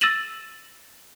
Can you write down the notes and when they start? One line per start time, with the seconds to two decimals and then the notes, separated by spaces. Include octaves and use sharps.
0.01 E6 A6 A#6 D#7 E7 F#7